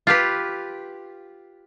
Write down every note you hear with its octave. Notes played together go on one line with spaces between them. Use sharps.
F4 G4 B4